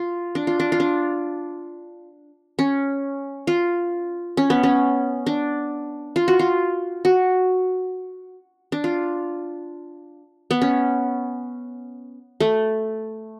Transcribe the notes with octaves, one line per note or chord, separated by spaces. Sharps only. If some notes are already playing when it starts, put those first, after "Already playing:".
Already playing: F4
D4
F4
D4
F4
D4
C#4
F4
C#4
B3
C#4
D4
F4
F#4
F4
F#4
D4
F4
B3
C#4
A3